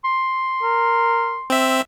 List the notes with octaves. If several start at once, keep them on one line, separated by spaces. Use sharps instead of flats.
C6
A#4
C4 E5